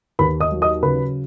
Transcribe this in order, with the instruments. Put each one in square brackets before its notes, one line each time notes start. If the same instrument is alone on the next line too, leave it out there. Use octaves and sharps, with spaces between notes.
[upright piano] D#2 B4 B5
D#5 D#6
F#3
D#5 D#6
C#3 B4 B5